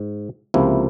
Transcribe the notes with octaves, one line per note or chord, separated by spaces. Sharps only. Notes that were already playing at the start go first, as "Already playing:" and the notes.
Already playing: G#2
C#2 C3 F3 A#3 E4